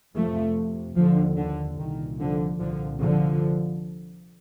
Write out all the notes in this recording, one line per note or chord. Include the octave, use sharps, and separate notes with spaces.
F2 C3 F3 A3
D#2 D3 F3
D3
C2 A#2 D#3
D3 F3
C2 A#2 D3 F3
D3 F3